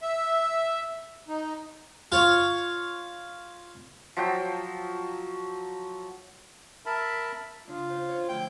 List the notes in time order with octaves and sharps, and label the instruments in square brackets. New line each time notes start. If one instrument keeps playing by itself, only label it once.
[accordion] E5
D#4
[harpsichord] F4 C#5
[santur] F3 F#3 G5
[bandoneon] A#4 E5 A5 B5
[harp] C#3 D4 [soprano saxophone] F4
[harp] C#4 C5
C#5
[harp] A2 D3 F3 [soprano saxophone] G5